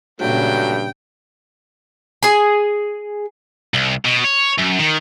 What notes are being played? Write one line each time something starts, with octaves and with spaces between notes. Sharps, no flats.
G2 A#2 C#3 F#3 A3 G5
G#4 G#5
C2
B2
C#5
F#2
D#3